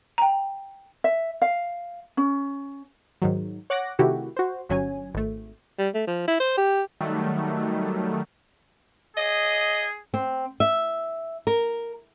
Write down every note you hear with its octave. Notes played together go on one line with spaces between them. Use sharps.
G5 A#5
E5
F5
C#4
G#2 D#3 F#3
C#5 F#5 D6 F#6 A#6
C3 D#3 A3 E4 F#4 G4
F#4 C5
G1 F#3 C#4 G#5
G#1 A3
G3
A3
F3
E4
C5
G4
D#3 F#3 G3 A3
G#4 D#5
C4
E5
A#4